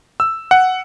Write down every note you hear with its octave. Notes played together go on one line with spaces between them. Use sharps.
E6
F#5